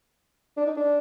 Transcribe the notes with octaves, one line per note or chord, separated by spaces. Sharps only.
D4
D#4
D4